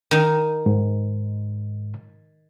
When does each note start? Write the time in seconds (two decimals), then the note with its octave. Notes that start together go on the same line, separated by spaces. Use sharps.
0.11 D#3 D#4
0.66 G#2